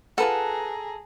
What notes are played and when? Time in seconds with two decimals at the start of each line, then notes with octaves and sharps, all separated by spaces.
0.18 F4 G#4 A4 B4 F#5 A#5